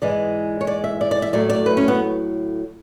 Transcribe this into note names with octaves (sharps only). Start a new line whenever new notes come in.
G#2 E3 G#3 D5
C#5
D5
E5
D5
D5
E5
A2 F#3 A3 D5
D5
B4
C#4
B3